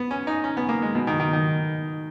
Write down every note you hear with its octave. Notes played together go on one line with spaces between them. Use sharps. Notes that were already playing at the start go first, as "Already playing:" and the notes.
Already playing: B3
C#4
D#4
C#4
B3
A#3
G#3
B2
D#3
D#3
D#3